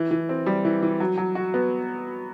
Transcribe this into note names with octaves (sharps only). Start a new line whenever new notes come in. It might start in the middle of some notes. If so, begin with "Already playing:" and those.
Already playing: E3
E3
C4
G3
E3
E3
F#3
F#3
F#4
B3